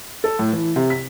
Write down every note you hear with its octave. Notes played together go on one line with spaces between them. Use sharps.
A4
A2
E3
C3
B6